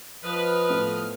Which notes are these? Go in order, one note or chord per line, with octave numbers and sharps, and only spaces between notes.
F3 B4 D#5 F6
A2 A3 B3